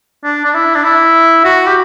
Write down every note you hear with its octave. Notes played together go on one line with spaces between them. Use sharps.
D4
D4
E4
D4
E4
F#4
G4